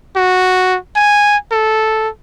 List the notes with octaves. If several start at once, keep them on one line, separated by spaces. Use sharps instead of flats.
F#4
G#5
A4